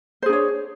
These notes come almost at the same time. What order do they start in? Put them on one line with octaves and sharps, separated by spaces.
C5 G#4 D4 C#5